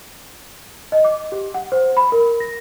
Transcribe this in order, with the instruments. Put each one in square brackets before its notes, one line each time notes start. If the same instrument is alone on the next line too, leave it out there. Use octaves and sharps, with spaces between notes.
[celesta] D#5
D6
G4
F#5
C5
B5
A#4
A#6